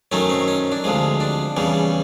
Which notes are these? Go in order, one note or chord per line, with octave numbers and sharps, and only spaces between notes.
F#2 D#3 F#3 A3 C#4
C4
C#4
D4
D2 C3 F3 G#3
D4
E2 C#3 E3 G3